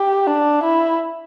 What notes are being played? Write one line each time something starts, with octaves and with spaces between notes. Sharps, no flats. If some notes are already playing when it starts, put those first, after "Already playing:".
Already playing: G4
D4
E4